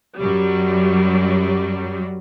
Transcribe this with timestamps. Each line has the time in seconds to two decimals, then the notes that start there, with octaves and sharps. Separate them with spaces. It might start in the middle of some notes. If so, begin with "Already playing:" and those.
0.17 F#2 F#3 G3